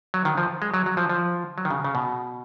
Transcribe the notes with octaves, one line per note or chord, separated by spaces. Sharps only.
F#3
D#3
F3
G#3
F#3
F#3
F3
F3
F#3
D#3
C#3
C#3
B2